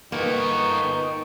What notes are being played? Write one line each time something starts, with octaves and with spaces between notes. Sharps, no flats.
G2 A#3 B3 D#4 G5 C#6